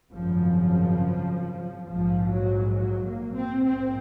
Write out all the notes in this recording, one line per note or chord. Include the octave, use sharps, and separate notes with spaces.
G#1 F#2 C#3 F3
A#1 G#2 F3
F#3
F#3
A#3
C4
A#1 G#2 C4